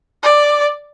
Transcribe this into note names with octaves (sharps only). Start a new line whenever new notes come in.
D5